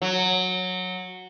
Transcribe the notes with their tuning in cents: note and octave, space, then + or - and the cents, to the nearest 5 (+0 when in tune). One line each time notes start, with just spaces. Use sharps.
F#3 -10